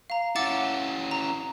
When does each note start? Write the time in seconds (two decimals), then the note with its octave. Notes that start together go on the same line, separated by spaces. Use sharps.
0.10 F5 A#5
0.36 C#4 E4 F#5 D6 A6
1.11 A#5